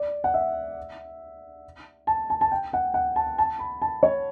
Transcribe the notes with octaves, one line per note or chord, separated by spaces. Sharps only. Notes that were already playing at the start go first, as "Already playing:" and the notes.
Already playing: D5
F#5
E5
A5
A5
A5
G5
F#5
F#5
A5
A5
B5
A5
C#5